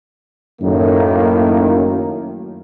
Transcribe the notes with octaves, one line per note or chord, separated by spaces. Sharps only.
F#2 A2 D#3 A#3